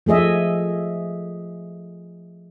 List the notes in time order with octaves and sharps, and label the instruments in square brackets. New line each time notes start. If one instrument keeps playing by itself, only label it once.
[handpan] F3 A3 G#4 D#5 E5